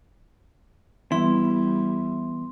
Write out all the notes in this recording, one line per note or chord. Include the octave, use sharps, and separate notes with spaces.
E3 G3 B3 E4 C6